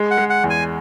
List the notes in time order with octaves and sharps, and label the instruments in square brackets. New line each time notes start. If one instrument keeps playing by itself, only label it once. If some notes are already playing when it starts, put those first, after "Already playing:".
Already playing: [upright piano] G#3
[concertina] F#5
[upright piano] G#3
[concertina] F#5
[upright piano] E2
[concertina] G#5